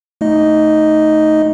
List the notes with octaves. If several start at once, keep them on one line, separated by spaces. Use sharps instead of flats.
A3 D#4 D#5